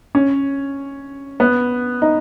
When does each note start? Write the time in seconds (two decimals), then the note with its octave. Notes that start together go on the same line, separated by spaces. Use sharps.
0.15 C#4
1.40 B3
2.02 D#4